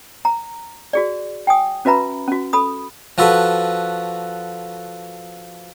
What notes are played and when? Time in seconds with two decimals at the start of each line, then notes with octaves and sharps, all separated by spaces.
0.25 A#5
0.93 F#4 G#4 D5
1.47 G5 G#5 D#6
1.85 C#4 F#4 B4 E5 A#5 B5
2.28 C#4 F#4
2.53 A4 B5 D#6
3.18 F3 F#4 A4 B4